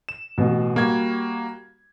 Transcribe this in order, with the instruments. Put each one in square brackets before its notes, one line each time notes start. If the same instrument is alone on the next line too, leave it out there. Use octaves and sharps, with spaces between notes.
[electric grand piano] E7
[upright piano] A1 B2
[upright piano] G3 [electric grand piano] A#3 F#4 G#6